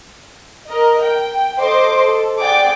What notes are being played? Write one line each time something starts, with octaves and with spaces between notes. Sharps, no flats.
A#4 D#5
G5
A4 C5 D#5 C6 D6
A4
G#4 D5 F#5 G5 D6